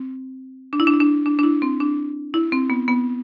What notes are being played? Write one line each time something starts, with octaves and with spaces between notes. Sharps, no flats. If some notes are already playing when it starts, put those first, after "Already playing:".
Already playing: C4
D4
E4
D4
E4
D4
D4
D4
E4
C4
D4
E4
C4
B3
B3